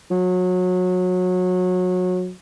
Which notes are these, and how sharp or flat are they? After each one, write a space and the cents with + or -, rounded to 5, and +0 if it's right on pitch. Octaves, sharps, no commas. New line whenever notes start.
F#3 -25